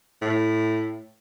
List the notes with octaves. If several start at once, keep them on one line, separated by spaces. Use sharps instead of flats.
A2